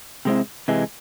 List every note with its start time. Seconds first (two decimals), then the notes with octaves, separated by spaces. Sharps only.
0.25 C3 G#3 C4 E4
0.68 C3 E3 G#3